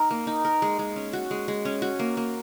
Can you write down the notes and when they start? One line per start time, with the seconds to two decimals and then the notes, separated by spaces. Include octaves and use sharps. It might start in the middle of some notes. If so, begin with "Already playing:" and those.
Already playing: D#4 A#4
0.11 A#3
0.27 D#4
0.45 A#4
0.62 G#3
0.79 G#3
0.96 C#4
1.13 F#4
1.31 G#3
1.48 G#3
1.65 C#4
1.82 F#4
1.99 A#3
2.17 A#3